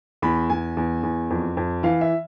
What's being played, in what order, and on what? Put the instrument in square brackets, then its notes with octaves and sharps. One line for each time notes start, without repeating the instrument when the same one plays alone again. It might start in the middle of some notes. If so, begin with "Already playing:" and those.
[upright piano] E2 B5
E2 G#5
E2
E2
F2
F2
E3 F5
E5